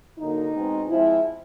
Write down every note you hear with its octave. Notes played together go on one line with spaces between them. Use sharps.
D3 F#3 A#3 D#4
B2 G#3 C4
F3 G#3 C4 E4